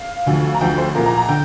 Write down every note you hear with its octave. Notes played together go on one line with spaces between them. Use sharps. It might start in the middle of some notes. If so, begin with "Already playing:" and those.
Already playing: F5
D2 D3 F3
A#5
D2 D3 F3 G5
C5
C2 A#2 F3 A#4
A#5
A#5
D3 G5